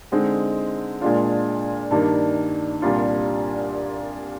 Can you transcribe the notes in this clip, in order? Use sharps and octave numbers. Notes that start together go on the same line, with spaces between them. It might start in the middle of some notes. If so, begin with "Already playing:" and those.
D3 G#3 C4 D#4
A#2 G#3 D4 F4
G2 D#3 A#3 D4
C2 A#2 G3 D4 F4